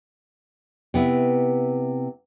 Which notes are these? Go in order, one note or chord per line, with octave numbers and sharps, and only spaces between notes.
C3 B3 E4